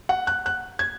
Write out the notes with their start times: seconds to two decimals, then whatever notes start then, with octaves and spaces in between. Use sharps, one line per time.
0.09 F#5
0.27 F#6
0.46 F#6
0.79 G#6